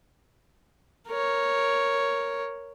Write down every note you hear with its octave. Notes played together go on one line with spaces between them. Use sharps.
A#4 C#5